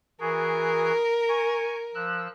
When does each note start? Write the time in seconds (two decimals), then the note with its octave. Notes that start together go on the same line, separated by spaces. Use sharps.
0.20 E3 F#4 G#4 A#4
1.28 G#5 C#6
1.95 F3 E6 F#6